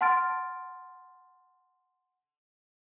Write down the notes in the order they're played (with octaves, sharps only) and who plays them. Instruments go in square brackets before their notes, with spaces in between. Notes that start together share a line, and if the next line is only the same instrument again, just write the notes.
[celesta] F#5 A5 C6 F6 A6 D7